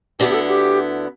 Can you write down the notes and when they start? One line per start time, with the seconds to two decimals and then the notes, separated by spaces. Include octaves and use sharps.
0.19 D2 D3 B3 E4 G4
0.30 G4
0.34 A4
0.48 G4